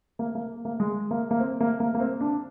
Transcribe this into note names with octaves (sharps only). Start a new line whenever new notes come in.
A#3
A#3
A#3
G#3
A#3
A#3
C4
A#3
A#3
A#3
C4
D4